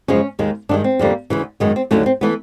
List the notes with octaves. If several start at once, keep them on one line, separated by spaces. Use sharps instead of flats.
F#2 C#3 F3 G#3 C#4
D#2 D#3 G#3
G2 D#3 G#3 D4
C4
F2 D3 G3 A#3
D2 C#3 E3
F#2 D#3 G#3 B3
C4
D#2 D3 F#3 A3 C#4
C4
E3 A3 B3